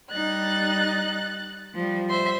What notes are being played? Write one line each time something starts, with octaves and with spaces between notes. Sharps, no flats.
G3 D#4 F#6 A6
F3 G3
C5 E5 C6